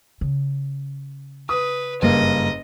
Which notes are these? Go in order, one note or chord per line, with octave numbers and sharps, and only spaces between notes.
C#3
B4 D#6
F#1 G2 A#3 D#5